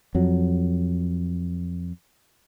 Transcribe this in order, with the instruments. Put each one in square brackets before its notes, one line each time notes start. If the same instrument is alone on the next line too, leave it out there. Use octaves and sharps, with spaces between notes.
[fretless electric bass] F2 F#3